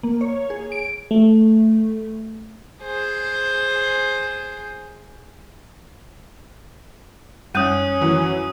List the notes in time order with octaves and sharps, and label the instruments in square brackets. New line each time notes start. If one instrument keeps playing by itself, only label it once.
[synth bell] A#3
C#5
G#4
D7
[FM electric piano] A3
[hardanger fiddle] G#4 C5
[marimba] F#2 G3 G6 [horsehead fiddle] C#4 [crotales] D#6 F#6 D#7
[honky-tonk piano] E3 F#3